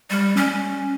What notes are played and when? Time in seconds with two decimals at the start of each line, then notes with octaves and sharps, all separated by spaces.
0.10 G3
0.37 C#4